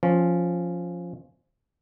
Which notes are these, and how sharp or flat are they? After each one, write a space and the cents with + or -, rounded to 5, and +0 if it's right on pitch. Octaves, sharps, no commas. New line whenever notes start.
F3 +5 C#4 +0